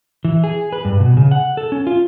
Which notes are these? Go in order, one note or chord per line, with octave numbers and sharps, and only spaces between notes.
E3
G#4
B4
G2
B2
C#3
F#5
A4
C#4
F4